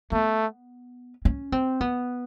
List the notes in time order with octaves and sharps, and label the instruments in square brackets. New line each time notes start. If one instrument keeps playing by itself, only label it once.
[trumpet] A3 [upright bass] B3
[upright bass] C#4
C4
B3